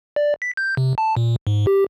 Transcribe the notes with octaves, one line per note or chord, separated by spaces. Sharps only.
D5
B6
G6
C3
A5
A#2
G#2
G4